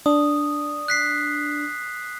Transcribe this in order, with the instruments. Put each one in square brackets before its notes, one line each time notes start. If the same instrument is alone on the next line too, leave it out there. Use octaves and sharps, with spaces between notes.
[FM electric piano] D4 [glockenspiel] D#6
[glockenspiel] F#6 B6 C7